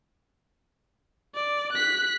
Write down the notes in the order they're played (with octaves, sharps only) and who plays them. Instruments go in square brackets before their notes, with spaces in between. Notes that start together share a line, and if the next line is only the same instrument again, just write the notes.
[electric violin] D5
F#6 B6